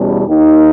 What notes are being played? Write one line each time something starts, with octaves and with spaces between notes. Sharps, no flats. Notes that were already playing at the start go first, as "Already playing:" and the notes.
Already playing: E2 B2 G3 C#4
D#2 D#3 A#3 D#4